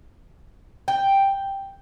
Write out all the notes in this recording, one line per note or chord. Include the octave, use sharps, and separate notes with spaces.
G5